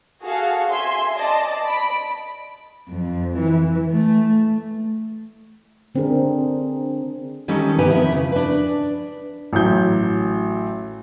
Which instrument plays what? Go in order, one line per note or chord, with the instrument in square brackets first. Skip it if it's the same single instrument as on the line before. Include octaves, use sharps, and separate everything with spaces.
[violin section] F#4 G#4 A4 F5
E5 G#5 C6
D5 D#5 A5
B5 D7
[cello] F2
E3
A3
[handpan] D3 C4 D4 G#4 A#4
[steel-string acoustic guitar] D#3 G3 C#4 D#4 A4
D#3 F3 B3 G4 B4 G#5
F2 C#4 E4
C#3
D4 B4
[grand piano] A1 F#3 G6